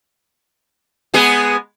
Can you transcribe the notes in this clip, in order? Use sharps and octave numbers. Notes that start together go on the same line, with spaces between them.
G#3 B3 G#4